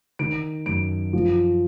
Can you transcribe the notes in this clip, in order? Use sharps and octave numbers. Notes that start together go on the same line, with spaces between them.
D#3 D7
F#2 D7
F3